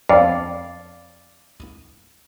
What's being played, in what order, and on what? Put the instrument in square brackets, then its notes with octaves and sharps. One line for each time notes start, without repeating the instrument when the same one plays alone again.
[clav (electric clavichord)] F2 [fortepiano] D5 F5